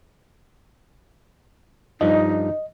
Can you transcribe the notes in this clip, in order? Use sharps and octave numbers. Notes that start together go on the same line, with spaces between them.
G2 F3 D#4 D#5